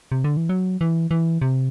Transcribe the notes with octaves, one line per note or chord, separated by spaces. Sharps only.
C3
D3
E3
F#3
E3
E3
C3